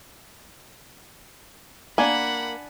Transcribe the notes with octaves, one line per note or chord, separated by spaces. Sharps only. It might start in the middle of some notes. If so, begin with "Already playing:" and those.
A#3 D4 F#5 G#5 B5